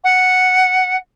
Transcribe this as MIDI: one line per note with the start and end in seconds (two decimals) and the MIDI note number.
0.04 0.96 78